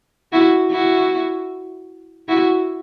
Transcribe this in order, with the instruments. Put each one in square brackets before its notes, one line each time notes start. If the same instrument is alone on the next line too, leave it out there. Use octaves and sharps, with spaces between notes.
[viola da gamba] E4 F#4
E4 F#4
E4 F#4